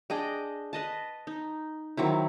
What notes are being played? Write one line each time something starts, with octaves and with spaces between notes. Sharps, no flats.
D4 G#4 D#5 G5
B4 D#5 A5
D#4
D#3 F#3 C4 E4